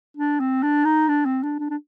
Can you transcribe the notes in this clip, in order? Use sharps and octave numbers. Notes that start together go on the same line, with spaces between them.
D4
C4
D4
D#4
D4
C4
D4
D4
D4